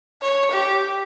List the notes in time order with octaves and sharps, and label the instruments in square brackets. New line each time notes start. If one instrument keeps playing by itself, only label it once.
[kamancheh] C#5
G4